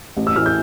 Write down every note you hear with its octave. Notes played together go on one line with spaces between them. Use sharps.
A1
E6
A2 E3 F6
G6